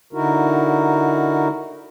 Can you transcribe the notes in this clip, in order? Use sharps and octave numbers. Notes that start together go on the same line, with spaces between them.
D3 D#4 E4 F#4 A#4